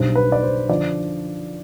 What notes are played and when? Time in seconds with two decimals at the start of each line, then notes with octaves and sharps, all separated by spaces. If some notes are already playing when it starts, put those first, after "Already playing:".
Already playing: B1 B2 G3 D4 C5
0.15 B4
0.32 D5
0.43 C5
0.69 D3 F3 D5